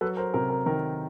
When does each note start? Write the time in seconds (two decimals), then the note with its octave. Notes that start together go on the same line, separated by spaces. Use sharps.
0.01 F#3 A4 B4
0.17 A#4 C5
0.34 C3 A#4
0.50 A#4
0.66 D#3 A#4